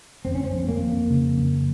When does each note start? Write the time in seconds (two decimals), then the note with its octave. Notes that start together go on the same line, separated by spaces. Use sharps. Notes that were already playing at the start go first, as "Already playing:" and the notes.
0.25 F2 C4
0.35 C#4
0.44 C4
0.53 F2
0.68 A#3
0.82 F2
1.10 C#3
1.38 F2